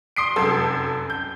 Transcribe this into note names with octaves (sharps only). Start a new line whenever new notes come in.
C6 D#6 C7 D7
F1 F#2 A4 E6
G6